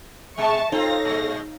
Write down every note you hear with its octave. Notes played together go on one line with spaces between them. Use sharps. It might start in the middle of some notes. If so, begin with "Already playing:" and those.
B2 G#3 E5 A5 C#6
C4 D#4 F4 A4 C#5 F5 A#6
A#2 G#3